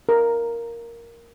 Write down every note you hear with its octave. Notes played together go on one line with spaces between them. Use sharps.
A#4